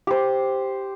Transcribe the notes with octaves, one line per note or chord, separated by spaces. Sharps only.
G4 C5